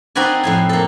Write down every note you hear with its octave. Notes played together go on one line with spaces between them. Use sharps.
C4 D#4 F#4 B4 D5 G#5
F2 A2 G#5
A#3 A4